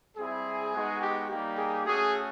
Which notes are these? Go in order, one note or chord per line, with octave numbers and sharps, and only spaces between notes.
G3 C4 E4 G#4
G#3 B3 D#4 F#4
G4
G3 A#3 D#4 G4
G#4
A3 C#4 F#4 G#4